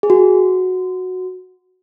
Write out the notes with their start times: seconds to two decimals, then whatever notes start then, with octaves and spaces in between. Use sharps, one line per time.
0.03 G#4
0.10 F#4